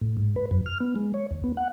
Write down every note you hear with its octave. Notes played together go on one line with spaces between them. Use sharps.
A2
G#2
B4
F#2
F6
B3
G#3
C#5
D#2
B3
F#5